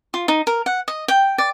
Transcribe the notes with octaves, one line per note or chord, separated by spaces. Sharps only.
F4
D#4
A#4
F#5
D#5
G5
D5